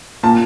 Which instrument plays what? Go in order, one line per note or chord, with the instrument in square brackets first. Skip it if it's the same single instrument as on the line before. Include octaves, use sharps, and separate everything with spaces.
[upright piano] A#2 A5